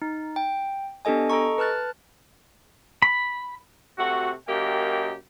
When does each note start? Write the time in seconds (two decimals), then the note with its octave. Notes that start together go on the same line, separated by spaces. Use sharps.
0.02 D#4
0.36 G5
1.05 B3 D4 G4 A4 D#5 G#5
1.30 A4 D#5 A#5 C#6
1.58 B4 A5 F6 F#6 A6
3.02 B5
3.98 C3 A3 F#4
4.48 F#2 A#3 G4 D#5 G5